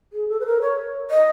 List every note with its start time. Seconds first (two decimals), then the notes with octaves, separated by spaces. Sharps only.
0.13 G#4
0.29 A4
0.40 B4
0.46 A#4
0.61 C#5
1.11 D#5